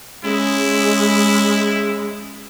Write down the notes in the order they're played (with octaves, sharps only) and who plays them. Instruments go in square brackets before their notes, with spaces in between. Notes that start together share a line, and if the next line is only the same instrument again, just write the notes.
[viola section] G#3 [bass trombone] C#4 [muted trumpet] E4